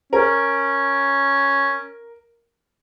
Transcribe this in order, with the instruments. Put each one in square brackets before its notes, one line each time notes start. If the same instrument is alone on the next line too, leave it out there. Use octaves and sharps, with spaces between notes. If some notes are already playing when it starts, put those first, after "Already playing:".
[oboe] C#4 [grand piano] A#4